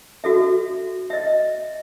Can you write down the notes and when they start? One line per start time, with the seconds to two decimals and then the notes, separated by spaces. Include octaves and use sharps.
0.24 F#4 A4 E5
1.10 D#5 E5